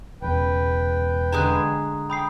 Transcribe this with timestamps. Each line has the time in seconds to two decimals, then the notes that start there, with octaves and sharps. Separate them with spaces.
0.22 E1 E2 C#3 B4 G5
1.32 D3 G#3 G#5 A#5 D#6 F#6
2.10 G5 B5 D#6 C7